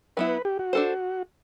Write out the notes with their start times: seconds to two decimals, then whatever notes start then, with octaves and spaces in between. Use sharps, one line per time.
0.17 F#3 B3 E4 B4
0.45 G4
0.59 F#4
0.73 D4 A4 C5